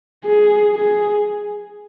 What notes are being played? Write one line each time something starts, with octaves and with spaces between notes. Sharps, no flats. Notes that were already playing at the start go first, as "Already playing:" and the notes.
G#4
G#4